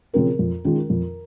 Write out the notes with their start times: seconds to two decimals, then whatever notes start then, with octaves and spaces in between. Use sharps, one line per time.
0.13 C#3 F3 C4 F4 A#4
0.39 F2
0.64 D#3 G#3 C#4 F4
0.90 F2